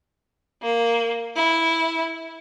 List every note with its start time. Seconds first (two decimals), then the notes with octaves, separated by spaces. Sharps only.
0.62 A#3
1.36 E4